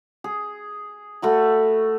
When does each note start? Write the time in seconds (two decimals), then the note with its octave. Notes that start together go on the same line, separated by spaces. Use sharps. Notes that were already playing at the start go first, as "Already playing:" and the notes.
0.24 G#4
1.22 A3 F#4 B5